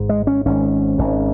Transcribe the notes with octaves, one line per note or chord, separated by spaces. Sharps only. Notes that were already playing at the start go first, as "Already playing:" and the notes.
Already playing: G#1 G#2
G#3
C#4
G#1 G#2 C#4
G#1 G#2